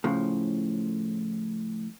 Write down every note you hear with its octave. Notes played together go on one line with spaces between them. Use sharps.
A2 C#3 F3